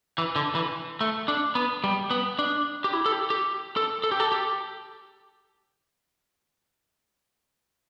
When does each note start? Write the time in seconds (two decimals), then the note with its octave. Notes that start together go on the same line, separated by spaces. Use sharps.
0.18 E3
0.36 D3
0.55 E3
1.01 A3
1.28 D4
1.55 B3
1.84 G3
2.11 B3
2.39 D4
2.84 G4
2.93 E4
3.06 A4
3.12 G4
3.30 G4
3.77 A4
4.04 A4
4.12 G4
4.20 A4
4.32 G4